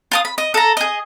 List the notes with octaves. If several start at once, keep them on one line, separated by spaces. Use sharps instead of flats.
F4 A5 D#6
B5
D#5
A4 A#5
G#4 D#5